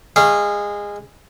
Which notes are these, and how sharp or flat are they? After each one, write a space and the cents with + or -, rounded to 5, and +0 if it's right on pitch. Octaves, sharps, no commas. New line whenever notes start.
G#3 -20 F5 -20 C#6 +0